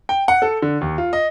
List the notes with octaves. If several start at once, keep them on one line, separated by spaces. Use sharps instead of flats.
G5
F#5
A4
D3
D#2
F4
D#5